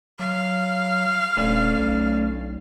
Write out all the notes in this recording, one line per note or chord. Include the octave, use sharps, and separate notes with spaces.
F#3 F5
D#1 A3 C#4 D4
B1